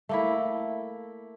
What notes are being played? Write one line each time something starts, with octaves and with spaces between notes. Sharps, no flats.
A3 A#3 E4